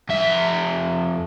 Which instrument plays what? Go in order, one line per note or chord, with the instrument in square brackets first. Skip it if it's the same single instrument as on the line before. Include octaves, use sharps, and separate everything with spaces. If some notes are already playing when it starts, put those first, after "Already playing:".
[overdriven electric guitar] F2 E5